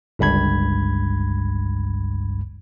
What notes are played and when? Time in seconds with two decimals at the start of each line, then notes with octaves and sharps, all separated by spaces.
0.19 G1 C#2 G2 B5 G#6